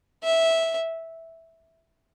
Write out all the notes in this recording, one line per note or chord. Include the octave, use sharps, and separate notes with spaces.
E5